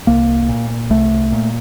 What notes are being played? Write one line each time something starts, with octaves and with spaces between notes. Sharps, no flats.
C2 A#3
A#2
C2 A3
A#2